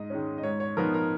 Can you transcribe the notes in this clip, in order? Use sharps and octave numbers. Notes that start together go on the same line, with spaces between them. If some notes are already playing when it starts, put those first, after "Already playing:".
Already playing: G#2 D#5
D#3 G#3 C#4
D#5
G#2 C#5
C#5
F3 B3 D#4 A#4
A#4